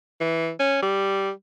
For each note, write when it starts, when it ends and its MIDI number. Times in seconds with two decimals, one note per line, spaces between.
0.21 0.51 52
0.60 0.78 61
0.82 1.31 55